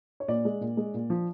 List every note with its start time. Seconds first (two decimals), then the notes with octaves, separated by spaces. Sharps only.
0.20 C#5
0.28 A#2 D5
0.45 G#3
0.61 A#2
0.77 G#3
0.94 A#2
1.10 F3